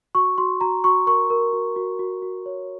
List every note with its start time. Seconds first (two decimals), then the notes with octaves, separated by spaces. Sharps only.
0.15 F#4 C#6
0.38 F#4 C6
0.61 F#4 A#5
0.84 F#4 C#6
1.07 A#4 C#6
1.30 A#4
1.53 F#4
1.76 F#4
1.99 F#4
2.22 F#4
2.46 C#5